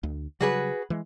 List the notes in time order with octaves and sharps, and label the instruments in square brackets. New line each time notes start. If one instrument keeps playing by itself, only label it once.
[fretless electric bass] D2
[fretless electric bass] C#3 F#3 G3 [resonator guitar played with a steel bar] F#4 G#4 B4
[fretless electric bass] E3 G#3